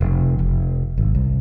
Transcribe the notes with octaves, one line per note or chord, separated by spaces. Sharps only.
F1
F1
G#1
C2